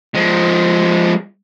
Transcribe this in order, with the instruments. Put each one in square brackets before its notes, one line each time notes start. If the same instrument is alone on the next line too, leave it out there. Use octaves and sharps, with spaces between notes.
[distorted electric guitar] F3 G#3